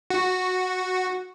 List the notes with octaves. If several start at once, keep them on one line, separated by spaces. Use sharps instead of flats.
F#4